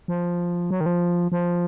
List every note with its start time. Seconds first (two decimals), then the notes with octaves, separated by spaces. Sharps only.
0.08 F3
0.71 F#3
0.81 D#3
0.86 F3
1.32 F3